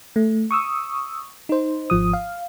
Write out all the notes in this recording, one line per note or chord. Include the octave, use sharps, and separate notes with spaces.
A3
C#6 D#6 E6
D#4 C5
G#1 F3 D#6
F5